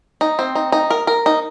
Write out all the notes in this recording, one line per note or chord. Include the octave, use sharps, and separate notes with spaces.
D#4
C4
D#4
D#4
A#4
A#4
D#4